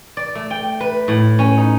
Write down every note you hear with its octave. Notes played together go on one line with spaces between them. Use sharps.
D5
A3
G5
B4
A2
C#4
D#4